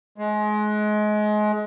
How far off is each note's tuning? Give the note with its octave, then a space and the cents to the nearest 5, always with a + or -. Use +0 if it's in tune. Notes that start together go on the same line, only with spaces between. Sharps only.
G#3 +25